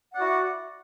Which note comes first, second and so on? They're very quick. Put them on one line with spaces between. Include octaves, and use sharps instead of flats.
F#5 D5 F#4 E4